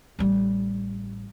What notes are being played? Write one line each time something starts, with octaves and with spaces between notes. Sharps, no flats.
A1 G3